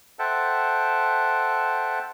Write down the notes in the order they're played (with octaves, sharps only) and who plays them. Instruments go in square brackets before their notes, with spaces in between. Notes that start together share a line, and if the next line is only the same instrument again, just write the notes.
[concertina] A4 C5 E5 F#5 G5 A5